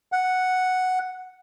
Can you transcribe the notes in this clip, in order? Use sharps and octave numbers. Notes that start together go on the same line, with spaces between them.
F#5